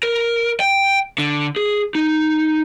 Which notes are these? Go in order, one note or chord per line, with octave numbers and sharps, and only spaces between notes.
A#4
G5
D3
G#4
D#4